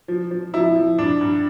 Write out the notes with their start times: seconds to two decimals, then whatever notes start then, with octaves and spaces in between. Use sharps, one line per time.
0.08 F3
0.31 F3
0.54 F3 E4
0.76 F3
0.98 G2 D4
1.21 G2